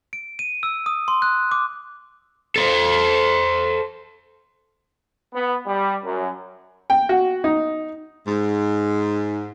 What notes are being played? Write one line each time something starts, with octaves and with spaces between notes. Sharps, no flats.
D7
D#7
E6
D#6
C6
F#6
D6
A4 C5
B3
G3
F#2
G5
F#4
D#4
G#2